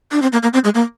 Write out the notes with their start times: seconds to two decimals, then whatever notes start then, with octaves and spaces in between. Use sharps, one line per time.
0.12 D4
0.22 C4
0.33 A#3
0.43 A#3
0.53 C4
0.64 G#3
0.75 A#3